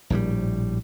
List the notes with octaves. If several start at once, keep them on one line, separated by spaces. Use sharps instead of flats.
A#1 A2 D3 G3